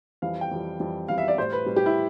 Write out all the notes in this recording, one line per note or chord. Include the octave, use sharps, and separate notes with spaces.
F2 E3 G3 F5
G5
F2 E3 G3
F2 E3 G3
F2 E3 G3 F5
E5
D5
A2 G3 C5
B4
A2 G3
G4
E4